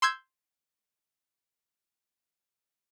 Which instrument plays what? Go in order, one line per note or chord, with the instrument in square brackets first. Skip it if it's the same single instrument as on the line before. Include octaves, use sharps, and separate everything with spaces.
[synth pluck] C6 E6 G6 G#6